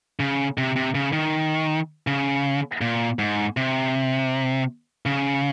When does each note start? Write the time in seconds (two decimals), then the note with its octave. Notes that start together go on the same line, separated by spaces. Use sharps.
0.20 C#3
0.58 C3
0.76 C3
0.95 C#3
1.13 D#3
2.07 C#3
2.81 A#2
3.19 G#2
3.57 C3
5.06 C#3